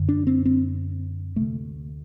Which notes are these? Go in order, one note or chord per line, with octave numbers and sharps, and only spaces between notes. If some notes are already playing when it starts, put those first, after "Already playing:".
Already playing: F#2 D3
D4
C4
C4
D2 C3 A3